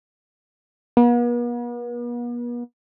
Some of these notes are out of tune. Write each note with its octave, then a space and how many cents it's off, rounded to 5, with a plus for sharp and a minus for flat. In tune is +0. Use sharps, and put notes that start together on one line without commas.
B3 -45